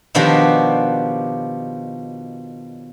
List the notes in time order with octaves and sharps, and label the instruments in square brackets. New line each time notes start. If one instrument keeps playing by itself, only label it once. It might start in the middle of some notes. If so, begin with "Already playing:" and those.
[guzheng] B2 D#3 F3 D4 F#4 G4